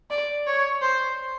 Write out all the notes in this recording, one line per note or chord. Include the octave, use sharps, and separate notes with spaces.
D5
C#5
C5